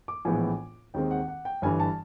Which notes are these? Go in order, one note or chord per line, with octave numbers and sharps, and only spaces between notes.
D6
A#1 A2 E3 G#3 B3 G#5
D#2 D#3 G#3 C4 G5
F#5
F#5
G5
G1 G2 E3 G#5
A5